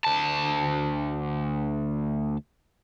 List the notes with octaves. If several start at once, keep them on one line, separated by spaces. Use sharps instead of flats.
D2 A5